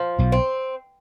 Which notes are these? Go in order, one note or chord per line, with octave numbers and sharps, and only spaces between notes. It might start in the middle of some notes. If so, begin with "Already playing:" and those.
Already playing: F3
B1 B2
C4